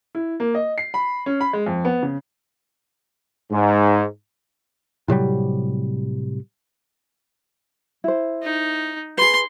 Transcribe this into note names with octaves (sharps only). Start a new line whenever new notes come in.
E4
A#3
D#5
C7
B5
C#4
B5
G#3
F2
B3
C#3
G#2
A2 C3 F#3 G3
E4 C5
D#4
G#4 B4 C6